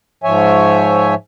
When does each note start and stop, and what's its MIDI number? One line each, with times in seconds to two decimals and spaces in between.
0.24 1.15 44
0.24 1.15 53
0.24 1.15 73
0.24 1.15 76
0.24 1.15 80